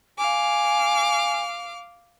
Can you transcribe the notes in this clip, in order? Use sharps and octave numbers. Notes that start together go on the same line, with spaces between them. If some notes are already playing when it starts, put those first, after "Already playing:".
F5 G#5 D6